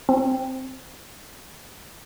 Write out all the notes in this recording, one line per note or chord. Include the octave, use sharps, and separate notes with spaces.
C4